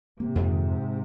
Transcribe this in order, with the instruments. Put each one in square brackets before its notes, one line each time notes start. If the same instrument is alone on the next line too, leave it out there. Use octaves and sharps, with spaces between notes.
[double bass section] G#2 C3 [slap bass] A#3
[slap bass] F2
D#3